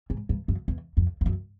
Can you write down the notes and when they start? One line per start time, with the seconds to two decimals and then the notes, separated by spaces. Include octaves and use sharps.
0.10 G#2
0.29 G2
0.48 F#2
0.68 E2
0.97 F2
1.21 F2
1.26 F#2